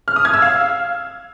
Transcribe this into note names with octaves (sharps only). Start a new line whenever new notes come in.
F6
D#6
G#6
E6
F5